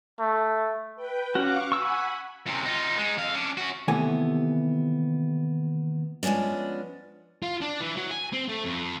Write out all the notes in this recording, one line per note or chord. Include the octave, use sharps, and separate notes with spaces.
A3
B4 G5
C#4 F#4 F5 C#6 D6
F#5 G#5 B5 C#6 E6
F#2 C3
D#4 F4
G#3 D#4
F2 F5
C#4 D4
C#4 F#4
D#2 C3 E3 A3 B3 G#5
F3 G#3 B3 C#4 D4
F4
D4
E3
F#3
G#5
C4
A3
F2